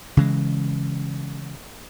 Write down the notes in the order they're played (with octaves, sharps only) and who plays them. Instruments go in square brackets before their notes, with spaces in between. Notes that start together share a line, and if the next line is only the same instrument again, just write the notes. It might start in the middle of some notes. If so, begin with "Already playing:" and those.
[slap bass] C#3 E3 G#3